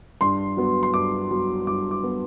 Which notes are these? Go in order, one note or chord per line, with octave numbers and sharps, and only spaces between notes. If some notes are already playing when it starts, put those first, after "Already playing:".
G2 C6
F#3 B3
C6
G2 D6
F#3 B3
G2 D6
D6
F#3 B3